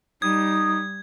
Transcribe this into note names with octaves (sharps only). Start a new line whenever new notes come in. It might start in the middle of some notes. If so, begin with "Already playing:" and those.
G3 D#4 D#6 G#6